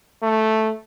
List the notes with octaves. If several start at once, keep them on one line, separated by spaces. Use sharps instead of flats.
A3